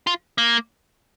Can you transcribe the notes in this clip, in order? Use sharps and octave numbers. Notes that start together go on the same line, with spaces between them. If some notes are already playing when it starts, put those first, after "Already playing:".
F4
A#3